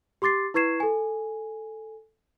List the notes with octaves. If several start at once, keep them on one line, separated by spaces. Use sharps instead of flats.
G4 C6 D6 A6 C7
E4 B4 C#6 G#6 C7 E7
A4 G#5